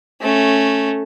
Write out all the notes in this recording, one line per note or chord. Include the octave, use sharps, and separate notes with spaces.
A3 C#4